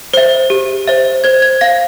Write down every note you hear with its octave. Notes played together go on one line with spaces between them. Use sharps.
C5 E5
G4
C5 E5
C5 G#6
G#6
F5 A#6